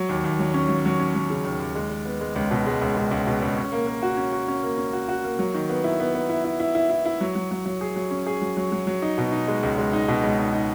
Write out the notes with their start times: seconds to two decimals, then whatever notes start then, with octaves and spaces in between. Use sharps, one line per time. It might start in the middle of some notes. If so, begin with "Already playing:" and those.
Already playing: F#3
0.09 D#2
0.24 D#2
0.39 F#3
0.54 C#4
0.69 F#3
0.85 F#3
1.00 C#4
1.15 F#3
1.30 C#3
1.45 D#2
1.60 D#2
1.75 G#3
1.90 G#3
2.05 B3
2.21 G#3
2.36 C#2
2.51 B2
2.66 G#3
2.81 C#2
2.96 C#2
3.11 C#2
3.27 B2
3.42 C#2
3.57 C#4
3.72 A#3
3.87 A#3
4.03 F#4
4.17 C#4
4.33 F#4
4.48 C#4
4.63 A#3
4.78 C#4
4.93 F#4
5.09 F#4
5.24 A#3
5.39 F#3
5.54 D#3
5.69 B3
5.84 E4
6.00 B3
6.15 B3
6.30 E4
6.44 E4
6.60 E4
6.75 E4
6.90 E4
7.05 E4
7.21 F#3
7.35 F#3
7.51 F#3
7.66 F#3
7.81 G#4
7.96 F#3
8.11 C#4
8.26 G#4
8.42 F#3
8.57 F#3
8.72 F#3
8.87 F#3
9.02 D#4
9.18 B2
9.32 D#4
9.48 G#3
9.63 C#2
9.78 G#3
9.93 D#4
10.08 B2
10.24 C#2
10.39 D#4
10.53 D#4